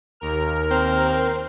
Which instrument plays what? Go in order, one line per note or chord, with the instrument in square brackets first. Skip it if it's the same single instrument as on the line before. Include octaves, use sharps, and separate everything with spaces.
[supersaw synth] D#2 A#4 F6
[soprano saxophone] C4